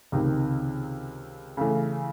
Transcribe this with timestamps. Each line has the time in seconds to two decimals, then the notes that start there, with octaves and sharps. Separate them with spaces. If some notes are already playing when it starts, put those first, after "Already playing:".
0.12 C#2 C3 D#3
1.57 C#3 E3 A3